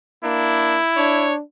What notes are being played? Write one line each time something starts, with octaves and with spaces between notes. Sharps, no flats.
A#3 D4 E4
D4 C#5